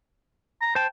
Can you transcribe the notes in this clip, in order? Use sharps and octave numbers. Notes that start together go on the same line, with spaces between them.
A#5
C5 G5 A5